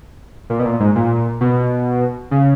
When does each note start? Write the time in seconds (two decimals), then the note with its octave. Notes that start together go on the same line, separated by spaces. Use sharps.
0.50 A#2
0.59 B2
0.65 A#2
0.80 G#2
0.95 A#2
1.41 B2
2.31 C#3